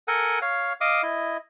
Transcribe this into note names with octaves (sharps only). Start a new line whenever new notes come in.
A4 A#4 F#5 G#5
C#5 F5
D#5 F5 D6 D#6
E4 D#5